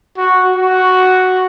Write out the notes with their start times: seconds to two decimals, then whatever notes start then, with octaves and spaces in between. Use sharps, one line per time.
0.17 F#4
0.56 F#4